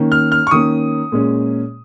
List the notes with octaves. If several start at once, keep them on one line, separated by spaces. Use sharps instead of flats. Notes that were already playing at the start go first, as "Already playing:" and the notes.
Already playing: D#3 A#3 C#4
F6
F6
C#6
D#3 A#3 C#4 D#6
A#2 G#3 C#4